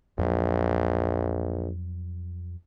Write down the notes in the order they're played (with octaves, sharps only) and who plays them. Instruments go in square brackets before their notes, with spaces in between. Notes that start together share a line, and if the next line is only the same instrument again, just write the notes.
[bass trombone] A#1 [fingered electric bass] F2 F#3